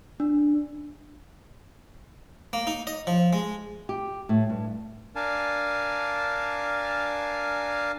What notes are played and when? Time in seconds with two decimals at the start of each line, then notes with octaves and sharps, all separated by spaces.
0.20 D4
2.53 A#3
2.67 D#4
2.87 D#5
3.07 F3
3.33 G#3
3.89 G4
4.29 A2
4.49 G2
5.16 D4 A#4 F5 G#5 A5